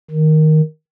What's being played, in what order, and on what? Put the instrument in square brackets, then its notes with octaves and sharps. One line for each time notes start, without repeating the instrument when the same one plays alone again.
[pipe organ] D#3